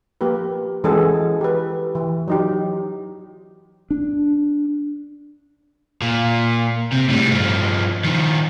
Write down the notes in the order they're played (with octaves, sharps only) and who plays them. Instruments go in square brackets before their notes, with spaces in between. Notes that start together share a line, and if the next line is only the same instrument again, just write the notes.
[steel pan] F3 A#3 G4 A#4 B4
E3 G#3 C#4 F#4 G#4 A4
G4 B4
E3
F#3 D#4 G4
[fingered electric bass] D4
[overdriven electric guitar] A#2
C3
A2 G3
G2 F3
D#3 F3